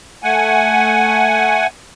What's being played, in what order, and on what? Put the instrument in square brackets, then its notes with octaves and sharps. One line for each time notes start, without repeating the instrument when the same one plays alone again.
[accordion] A3 F#5 G#5